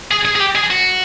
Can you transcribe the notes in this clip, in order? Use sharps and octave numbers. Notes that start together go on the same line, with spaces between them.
G#4
G#4
G#4
G4
G#4
F#4